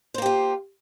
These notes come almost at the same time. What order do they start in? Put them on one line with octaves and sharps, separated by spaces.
C5 A#3 G4 F4